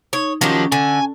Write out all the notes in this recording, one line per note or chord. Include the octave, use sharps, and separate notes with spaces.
D#4 C#5
D#3 F3 F#3 C#4 G4
D3 G#5